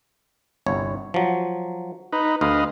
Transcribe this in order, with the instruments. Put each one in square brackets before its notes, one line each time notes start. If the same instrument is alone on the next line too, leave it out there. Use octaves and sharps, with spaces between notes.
[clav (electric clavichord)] G1 C2 C#5
F3 F#3
[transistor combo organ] D#4 B4
[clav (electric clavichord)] D2 [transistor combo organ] B4 D#5 F5